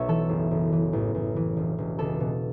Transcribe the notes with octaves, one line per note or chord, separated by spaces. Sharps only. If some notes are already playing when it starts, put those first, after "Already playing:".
Already playing: B1 B2 C#5 E5
E3 A4
F#1
F#1
E3
A1
A1
E3
E1
E1
C#2 A4
B2